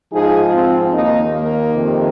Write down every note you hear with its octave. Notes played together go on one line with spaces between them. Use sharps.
G#2 F3 D#4 G#4
C4 F4
D#2 D#3 A#3 D#4
A#3
F2 C3 D#3